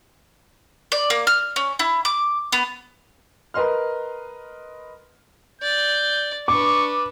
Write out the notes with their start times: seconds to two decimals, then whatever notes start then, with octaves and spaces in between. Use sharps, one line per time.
0.92 D5
1.10 A#3
1.27 F6
1.56 C#4
1.79 E4
2.05 D6
2.52 B3
3.54 A#4 B4 D#5 C6 F6
5.62 D5 G6
6.48 D4 B4 C#6 D6